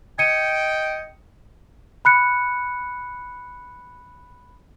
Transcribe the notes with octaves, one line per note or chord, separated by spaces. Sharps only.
D#5 G5 G#6 C#7 D#7
B5 F#6 C#7